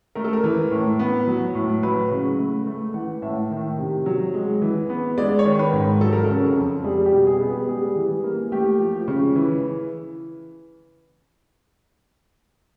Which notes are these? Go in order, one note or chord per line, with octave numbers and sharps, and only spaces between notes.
A3 A#4
A4
A#4
E3
A2
B3
F#3
A2
F#3 B4
C#3
A3
A3
E3 F#5
A2 E5
D#3
C3
F#3
G#3
E3
B3
G#3 D5
C#5
D#3
B4
G#2
F#3 A4
A#4
C#3 A4
F2
G3 G#4
G4
B2
G#4
B3
G#4
G3 G#4
E3
A#3
A3 G4
F3
C#3
E3